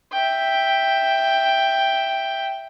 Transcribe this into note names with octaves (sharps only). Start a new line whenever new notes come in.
E5 G5